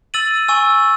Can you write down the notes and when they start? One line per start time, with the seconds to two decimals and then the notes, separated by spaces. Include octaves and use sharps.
0.14 E6 A6 D#7 F#7
0.48 G#5 C#6 E6